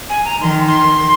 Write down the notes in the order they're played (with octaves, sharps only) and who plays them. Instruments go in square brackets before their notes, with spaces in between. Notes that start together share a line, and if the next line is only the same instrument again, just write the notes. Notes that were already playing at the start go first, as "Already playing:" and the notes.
[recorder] G#5
A#5
[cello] D#3 [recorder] C6
[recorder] C6